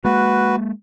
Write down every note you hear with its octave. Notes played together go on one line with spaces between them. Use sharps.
G#3 A#3 F#4 B4